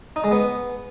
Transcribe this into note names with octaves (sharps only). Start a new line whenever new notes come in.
D#4
G#3
B3